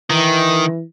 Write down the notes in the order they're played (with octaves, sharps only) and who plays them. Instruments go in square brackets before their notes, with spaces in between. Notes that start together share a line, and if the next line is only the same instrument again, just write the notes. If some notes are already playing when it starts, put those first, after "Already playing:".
[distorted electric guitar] D#3 [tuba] E3